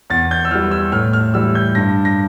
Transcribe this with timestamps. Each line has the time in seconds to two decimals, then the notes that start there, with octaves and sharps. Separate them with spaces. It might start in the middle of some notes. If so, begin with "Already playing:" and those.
0.10 E2 A6
0.31 G6
0.45 E6
0.51 E3 G3 F6
0.71 E6
0.92 A2 F6
1.13 F6
1.34 E3 G3 E6
1.55 G6
1.75 G2 A#6
2.05 A#6